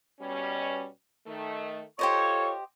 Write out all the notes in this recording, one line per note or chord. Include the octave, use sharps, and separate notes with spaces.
B2 G3 C#4
D#3 A3
F4 G4 A4 C5 C#5 D#5 C#6